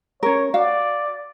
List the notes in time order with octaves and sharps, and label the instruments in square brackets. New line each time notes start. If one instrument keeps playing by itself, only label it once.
[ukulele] C#4 A#4 [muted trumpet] C#5
[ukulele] F#4 F5 [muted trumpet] D5